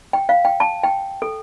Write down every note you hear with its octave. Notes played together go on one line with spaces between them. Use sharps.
G5
F5
G5
A5
G5
A4